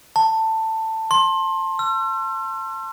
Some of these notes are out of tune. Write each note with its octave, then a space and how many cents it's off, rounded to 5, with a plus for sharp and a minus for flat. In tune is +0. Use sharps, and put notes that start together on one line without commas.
A5 +15
C6 +25
E6 +45